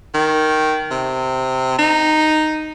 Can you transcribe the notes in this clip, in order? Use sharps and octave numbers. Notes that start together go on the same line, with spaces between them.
D#3
C3
D#4